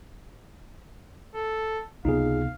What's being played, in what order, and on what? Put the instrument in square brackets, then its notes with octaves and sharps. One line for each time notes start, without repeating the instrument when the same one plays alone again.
[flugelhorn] A4
[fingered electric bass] C#2 C3 B3 [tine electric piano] D#4 F4 G#4 [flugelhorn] F5